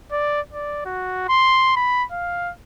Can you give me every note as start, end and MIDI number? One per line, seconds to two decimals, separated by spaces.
0.12 0.41 74
0.52 0.83 74
0.85 1.24 66
1.29 1.72 84
1.76 2.04 83
2.12 2.51 77